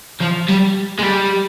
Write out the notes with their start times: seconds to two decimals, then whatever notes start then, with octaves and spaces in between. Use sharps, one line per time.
0.21 F3
0.49 G3
0.99 G#3
1.03 G3